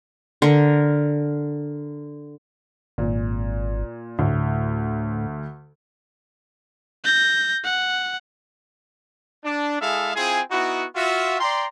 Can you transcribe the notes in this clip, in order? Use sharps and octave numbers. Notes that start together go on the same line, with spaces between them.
D3 A#4
G#1 A#2
D2 A2
G6 A#6
F#5
D4
G#3 E4 G#4 A4 E5 F5
C4 E4 F4 G#4
B3 D#4 E4 F#4
F4 F#4 E5
D5 G5 A#5 C6